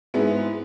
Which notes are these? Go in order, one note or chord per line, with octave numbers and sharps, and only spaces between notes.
G#2 G#3 B3 E4